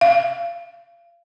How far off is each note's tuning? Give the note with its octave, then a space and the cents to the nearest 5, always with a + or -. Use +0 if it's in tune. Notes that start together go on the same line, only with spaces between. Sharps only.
F5 -30